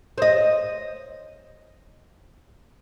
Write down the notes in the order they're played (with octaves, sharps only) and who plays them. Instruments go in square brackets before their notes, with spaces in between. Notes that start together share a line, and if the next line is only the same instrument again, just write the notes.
[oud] C5 D#5